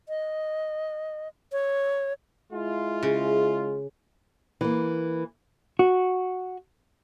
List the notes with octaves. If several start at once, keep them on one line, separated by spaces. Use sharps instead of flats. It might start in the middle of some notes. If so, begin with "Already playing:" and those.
D#5
C#5
G#3 E4 F4
C#3
E3 A#3
F#4